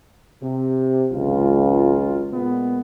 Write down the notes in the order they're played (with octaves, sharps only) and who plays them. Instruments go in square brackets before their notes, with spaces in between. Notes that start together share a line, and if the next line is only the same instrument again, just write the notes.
[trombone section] C3
[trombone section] G#1 F#3 F4 [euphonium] C#2
[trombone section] A#2 G#3 B3